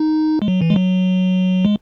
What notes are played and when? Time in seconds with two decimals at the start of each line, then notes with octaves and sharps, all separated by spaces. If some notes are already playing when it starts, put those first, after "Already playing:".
Already playing: D#4
0.42 G#3
0.48 F#3
0.61 E3
0.70 G#3
0.76 F#3
1.65 G#3